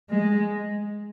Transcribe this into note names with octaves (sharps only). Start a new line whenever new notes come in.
G#3